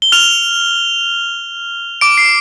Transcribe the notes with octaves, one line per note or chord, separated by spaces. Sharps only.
G7
F6 F7
D6 D7
C7